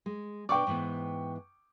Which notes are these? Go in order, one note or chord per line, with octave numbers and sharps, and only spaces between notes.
G#3
B2 D4 D5 G5 C#6 D6
G#2 E3 B3